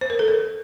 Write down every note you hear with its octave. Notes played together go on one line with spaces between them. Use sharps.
C5
A#4
A4
A#4